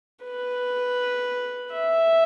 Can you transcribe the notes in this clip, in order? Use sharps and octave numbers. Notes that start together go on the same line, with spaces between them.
B4
E5